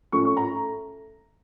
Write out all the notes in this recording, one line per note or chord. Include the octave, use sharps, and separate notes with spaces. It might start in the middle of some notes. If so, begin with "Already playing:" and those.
A2 A3 C#4 C#6
C#6
A#5